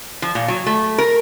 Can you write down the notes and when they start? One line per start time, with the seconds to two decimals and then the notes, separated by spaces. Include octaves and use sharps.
0.22 F3
0.35 A#2
0.48 F#3
0.66 A3
0.98 A#4